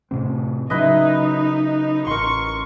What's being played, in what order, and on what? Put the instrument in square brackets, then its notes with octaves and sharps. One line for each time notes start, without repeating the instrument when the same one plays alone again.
[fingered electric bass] A2 C3 C4
[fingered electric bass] C#3 F#3 [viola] D#4 [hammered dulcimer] E4 B4 D#5
[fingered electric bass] A1 [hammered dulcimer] A#4 C6 [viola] C#6